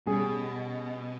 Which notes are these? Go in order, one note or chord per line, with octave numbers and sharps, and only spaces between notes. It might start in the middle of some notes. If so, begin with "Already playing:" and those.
B2 G3 C#4 G#4